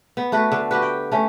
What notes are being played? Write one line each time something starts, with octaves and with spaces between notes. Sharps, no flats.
B3
A3 F#4 B4
D3
F#4 G4 B4
G5
A3 C#4